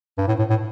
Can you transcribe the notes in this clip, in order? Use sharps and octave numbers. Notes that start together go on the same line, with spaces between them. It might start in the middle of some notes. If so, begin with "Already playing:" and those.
G2
A2
A2
A2